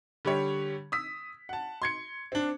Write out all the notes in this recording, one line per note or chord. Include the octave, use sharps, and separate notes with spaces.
D3 G3 G4 C#5
D#6 E6 B6
F#5 A5
C6 G#6 C#7
C4 D4